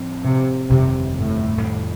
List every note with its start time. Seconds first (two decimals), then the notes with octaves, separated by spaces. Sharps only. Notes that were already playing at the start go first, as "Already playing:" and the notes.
Already playing: A2 F3 C4
0.24 C3
0.69 G1 F2 C3 D#3 G3
1.16 A2
1.62 F2 D#3 G3